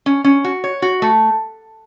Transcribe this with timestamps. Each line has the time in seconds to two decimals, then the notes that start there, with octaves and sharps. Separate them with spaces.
0.06 C#4
0.24 C#4
0.44 F#4
0.64 C#5
0.82 F#4
1.02 A3